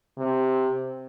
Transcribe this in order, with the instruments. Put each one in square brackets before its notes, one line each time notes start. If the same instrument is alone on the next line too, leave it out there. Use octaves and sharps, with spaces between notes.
[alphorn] C3